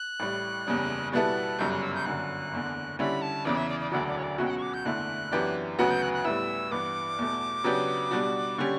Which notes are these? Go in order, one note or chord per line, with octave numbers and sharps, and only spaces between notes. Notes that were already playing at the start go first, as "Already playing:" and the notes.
Already playing: F#6
A1 A2 G3
F#1 E2 C#3 G3
B2 G3 B3 E4 A4 F#6
G1 F#2 C#3 G3 G6
F#6
E6
G6
G1 F#2 D3 F#6
F#1 E2 D3
D3 G3 C#4 E4 B5
A5
E2 C#3 E3 D5
E5
D5
D5
E1 D2 D3 F#3 D5
D5
C#5
D5
C#2 B2 F#3 C#4 F#4 E5
G5
F#5
C#6
D6
G6
F#1 E2 D3 A3 E4 F#6
F#2 E3 B3 D4 G4
D2 C#3 F#3 B3 F#4 F#6
G6
F#6
F#6
A2 G3 B3 E4 E6
G2 E3 B3 D6
E2 B2 A3
C#3 F#3 B3 D4 G4
B2 G3 D4 F#4
D3 G3 C#4 G4 C#6